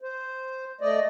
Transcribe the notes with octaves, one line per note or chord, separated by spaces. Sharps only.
C5
A3 D5 D#5